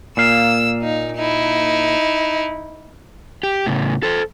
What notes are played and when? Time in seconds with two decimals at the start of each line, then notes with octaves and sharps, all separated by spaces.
0.17 A#2 A#3 F5 E6
0.82 D#4
1.16 D#4 E4
3.43 G4
3.66 A2 C#3
4.03 A4 C5